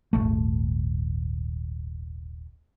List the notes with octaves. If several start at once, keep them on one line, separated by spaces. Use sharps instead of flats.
D#1 G#1 A3